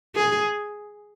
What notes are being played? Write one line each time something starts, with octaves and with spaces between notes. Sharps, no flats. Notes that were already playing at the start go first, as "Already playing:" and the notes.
G#4